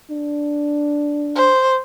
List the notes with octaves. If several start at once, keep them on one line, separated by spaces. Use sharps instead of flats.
D4
C5